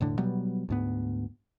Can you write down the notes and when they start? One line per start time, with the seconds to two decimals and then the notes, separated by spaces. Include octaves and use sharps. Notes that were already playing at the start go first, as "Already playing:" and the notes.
0.01 E1 A2 D3
0.18 B2 F#3 G3 B3
0.69 D2 G#2 B3